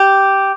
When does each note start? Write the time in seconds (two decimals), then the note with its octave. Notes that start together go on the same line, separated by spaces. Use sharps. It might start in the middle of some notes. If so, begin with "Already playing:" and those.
Already playing: G4